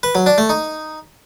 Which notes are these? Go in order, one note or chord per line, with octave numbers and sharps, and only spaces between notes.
B4
F#3
D4
A3
D#4